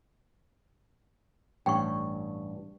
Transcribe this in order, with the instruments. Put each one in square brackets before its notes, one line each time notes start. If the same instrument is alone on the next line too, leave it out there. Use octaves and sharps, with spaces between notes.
[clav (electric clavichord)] A1 C#5 [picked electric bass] G2 [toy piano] G5 C#6